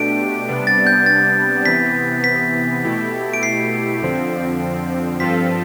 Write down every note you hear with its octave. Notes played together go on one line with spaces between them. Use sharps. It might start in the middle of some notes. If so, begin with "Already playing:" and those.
Already playing: B2 A3 D4 G4 D7
C3 G3 B3 D4
A6
G6
A6
C3 E3 B3 B6
B6
B2 A3 E4 G4
D7
C7
F2 D3 F3 C4
G2 F3 C4 F4 A4 B6